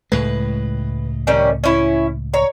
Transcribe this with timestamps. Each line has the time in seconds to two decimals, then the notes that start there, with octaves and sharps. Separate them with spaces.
0.12 C#2 A2 G#3 B4
1.27 D#3 G3 C#4
1.64 C#4 E4
2.34 C#5 A#5